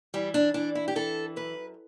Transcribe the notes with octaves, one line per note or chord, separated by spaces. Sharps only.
E3 G3
D4
E3 D4
E4
G4
E3 A4
F#2 B4